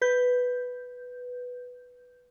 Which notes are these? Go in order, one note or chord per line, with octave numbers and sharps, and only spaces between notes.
B4 G6